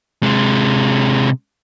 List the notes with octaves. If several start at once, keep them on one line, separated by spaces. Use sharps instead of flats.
C3 G#3